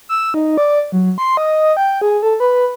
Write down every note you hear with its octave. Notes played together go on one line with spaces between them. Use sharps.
E6
D#4
D5
F#3
C6
D#5
G5
G#4
A4
B4